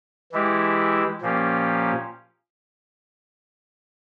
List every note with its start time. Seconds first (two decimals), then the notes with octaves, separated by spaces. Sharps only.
0.32 E3 G#3 E4 G4
1.21 A#2 F3 A#3 C#4 G4